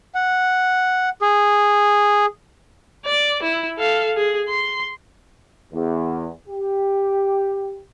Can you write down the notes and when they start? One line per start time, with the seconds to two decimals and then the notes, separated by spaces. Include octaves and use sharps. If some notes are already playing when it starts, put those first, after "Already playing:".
0.15 F#5
1.22 G#4
3.05 D5
3.43 E4
3.78 A4 F5
4.17 G#4
4.49 C6
5.72 E2
6.48 G4